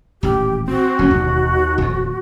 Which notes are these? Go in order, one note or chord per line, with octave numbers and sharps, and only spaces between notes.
D#1 A1 G4
C4 F#4
D1 F#3 A#3 C#4
E1 D#2
D#1 F2